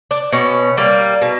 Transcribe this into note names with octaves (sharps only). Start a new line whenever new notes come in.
D4
B2 C#4
G3 A#3
B2